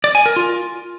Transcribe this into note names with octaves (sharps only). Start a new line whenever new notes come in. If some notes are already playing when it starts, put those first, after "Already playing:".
D5
G#5
A#4
F4